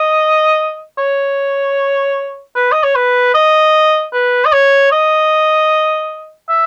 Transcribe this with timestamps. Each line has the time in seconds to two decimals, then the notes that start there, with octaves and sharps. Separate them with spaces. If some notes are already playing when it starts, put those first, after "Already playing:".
Already playing: D#5
0.99 C#5
2.56 B4
2.72 D#5
2.84 C#5
2.95 B4
3.35 D#5
4.13 B4
4.45 D#5
4.53 C#5
4.92 D#5
6.49 E5